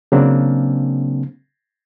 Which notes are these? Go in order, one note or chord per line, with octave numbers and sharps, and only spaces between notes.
C#3 F#3 A#3 C4 D4